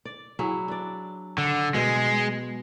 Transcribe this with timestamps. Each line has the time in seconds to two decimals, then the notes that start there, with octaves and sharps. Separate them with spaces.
0.05 D5
0.39 F#3 E4 G#4
0.68 D4 D5
1.38 D3
1.74 B2 G#3 D#5